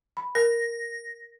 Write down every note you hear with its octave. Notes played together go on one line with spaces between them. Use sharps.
B5
A#4 A#6